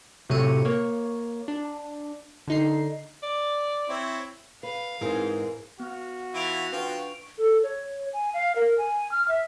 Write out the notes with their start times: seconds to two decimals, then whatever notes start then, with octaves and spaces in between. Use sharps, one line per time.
0.29 A2 C3 F#3 A3 C#7 D#7
0.65 A#3 C#5
1.48 D4
2.47 D3 D#4 C7
3.23 D5
3.89 C4 E4 C#5
4.63 B4 F5
5.01 G#2 E3 C4 D#4 G#4 A#4
5.80 B3 F#4 F6
6.34 E3 E4 F4 C#6 D7 F7
6.73 F3 D4 F4 B4 G5
7.38 A4
7.63 C#5
8.13 G#5
8.34 F5
8.56 A#4
8.78 G#5
9.12 F6
9.28 E5